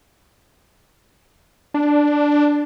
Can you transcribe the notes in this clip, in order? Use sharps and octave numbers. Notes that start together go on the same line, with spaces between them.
D4